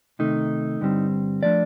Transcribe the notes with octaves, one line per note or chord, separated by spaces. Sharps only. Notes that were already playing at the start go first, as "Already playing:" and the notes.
C3 D#3 A3 D#4
G2 D3 G3 C4
F3 A3 D4 D5